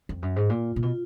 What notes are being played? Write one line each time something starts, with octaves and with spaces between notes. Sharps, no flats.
F2
F#2
G#2
A#2 F4
A#2
B2 F4